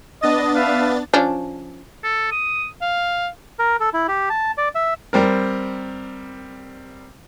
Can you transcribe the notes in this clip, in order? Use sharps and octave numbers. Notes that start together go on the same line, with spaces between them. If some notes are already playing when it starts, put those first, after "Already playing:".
B3 D4 D#5 A6
B4 E5 F5
F3 C#4 D4
A4
D#6
F5
A#4
A4
E4
G4
A5
D5
E5
G3 C4 A#4